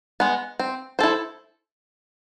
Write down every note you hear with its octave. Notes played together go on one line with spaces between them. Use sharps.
G#3 B3
C4
E4 A4 C5